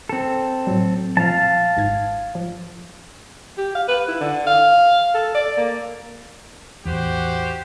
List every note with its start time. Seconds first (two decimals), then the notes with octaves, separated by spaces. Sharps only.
0.09 C4 A4
0.67 A2 F#3
1.17 A#2 F3 F5 A5
1.77 G#1 G#2 G#6
2.35 F3
3.58 G4
3.75 F5
3.88 B4
4.08 E4
4.21 D3
4.47 F5
5.14 A4
5.35 D5
5.57 A#3
6.85 A1 E2 F#4 G4 C5